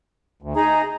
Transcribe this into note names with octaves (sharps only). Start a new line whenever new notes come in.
D2
D#4 G#4 A#5